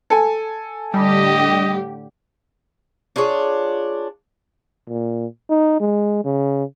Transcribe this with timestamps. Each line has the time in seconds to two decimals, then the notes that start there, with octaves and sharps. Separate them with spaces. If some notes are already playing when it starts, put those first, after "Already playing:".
0.10 A4 G#5
0.94 A2 D3 G3 G4 D#5
3.16 D4 F4 G#4 C#5
4.88 A#2
5.50 D#4
5.80 G#3
6.25 C#3